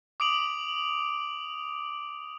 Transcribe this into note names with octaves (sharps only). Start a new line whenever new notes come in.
D6 D#6 D7 F7 F#7